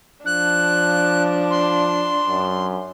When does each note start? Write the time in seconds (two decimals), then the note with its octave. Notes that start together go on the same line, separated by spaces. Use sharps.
0.26 F3 D4 F#6
1.50 C6
2.26 F#2